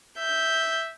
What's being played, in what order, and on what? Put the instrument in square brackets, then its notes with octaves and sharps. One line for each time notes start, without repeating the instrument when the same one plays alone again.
[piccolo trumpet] E5 [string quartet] G6